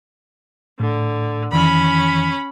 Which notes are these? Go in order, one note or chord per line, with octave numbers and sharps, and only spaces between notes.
A2 D3
F2 D#3 E3 C#4 B5